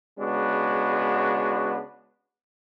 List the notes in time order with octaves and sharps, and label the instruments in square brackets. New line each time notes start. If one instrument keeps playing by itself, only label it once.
[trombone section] C#3 G#3 B3 D4 F#4